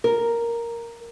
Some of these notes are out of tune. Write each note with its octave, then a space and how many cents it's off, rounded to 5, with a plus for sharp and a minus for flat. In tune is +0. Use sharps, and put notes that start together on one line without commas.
A#4 +0